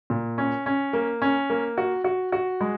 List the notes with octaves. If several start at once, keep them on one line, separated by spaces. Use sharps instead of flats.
A#2
C#4
C#4
A#3
C#4
A#3
F#4
F#4
F#4
G#3